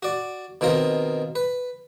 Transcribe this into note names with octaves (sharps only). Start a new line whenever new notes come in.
F#4 D5
B2 D#3 C4 F4 A#4
B4